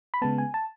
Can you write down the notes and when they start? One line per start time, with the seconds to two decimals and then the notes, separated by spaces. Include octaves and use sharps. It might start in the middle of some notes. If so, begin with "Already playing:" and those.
0.14 B5
0.22 C#3 G#3 B3 A5
0.38 G#5
0.54 A5